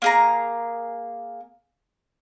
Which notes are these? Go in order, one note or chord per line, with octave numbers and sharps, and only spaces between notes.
A#3 G#4 A#5